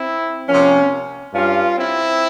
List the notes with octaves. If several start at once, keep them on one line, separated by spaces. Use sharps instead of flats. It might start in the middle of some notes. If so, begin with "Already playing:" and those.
Already playing: C4 E4
C3 F3 A#3 C#4
G2 G3 C#4 F4
C4 E4